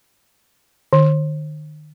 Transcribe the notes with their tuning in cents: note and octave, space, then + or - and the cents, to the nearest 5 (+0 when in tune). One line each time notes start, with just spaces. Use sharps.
D#3 -40